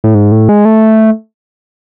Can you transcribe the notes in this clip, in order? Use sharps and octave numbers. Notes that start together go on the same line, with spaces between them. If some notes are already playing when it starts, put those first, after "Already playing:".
A2
G#2
A2
G#3
A3